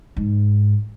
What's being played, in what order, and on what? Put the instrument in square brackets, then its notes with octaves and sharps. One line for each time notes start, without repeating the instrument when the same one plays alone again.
[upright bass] G#2